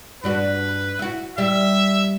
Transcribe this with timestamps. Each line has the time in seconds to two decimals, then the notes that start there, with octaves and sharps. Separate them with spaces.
0.24 G2 D4 F#4 B4
0.99 E4 F#4
1.38 G3 E5